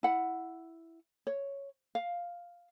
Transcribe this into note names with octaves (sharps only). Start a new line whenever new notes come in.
E4 F#5
C#5
F5